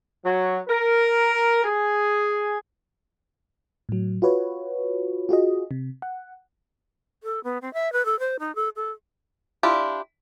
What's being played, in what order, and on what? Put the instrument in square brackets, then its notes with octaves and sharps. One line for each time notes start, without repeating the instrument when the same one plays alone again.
[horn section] F#3
A#4
G#4
[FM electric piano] A2 F#3
F4 F#4 B4 C#5
F4 F#4 G#4 D#5
C3
F#5
[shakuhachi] A4
B3
C4
E5
B4
A4
C5
D#4
A4
A4
[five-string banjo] D4 E4 F4 G4